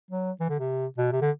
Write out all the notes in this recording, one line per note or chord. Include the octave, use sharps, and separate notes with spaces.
F#3
E3
D3
C3
B2
C3
D3